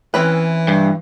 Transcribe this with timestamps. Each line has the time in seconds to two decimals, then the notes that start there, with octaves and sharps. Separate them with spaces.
0.14 E3 C4 C#4 B4
0.68 G2